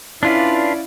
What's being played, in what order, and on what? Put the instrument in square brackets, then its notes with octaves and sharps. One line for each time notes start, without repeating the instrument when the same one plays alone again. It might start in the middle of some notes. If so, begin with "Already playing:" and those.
[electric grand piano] C#4 D5 F5 [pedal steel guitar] D4 F4 B4 [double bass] E4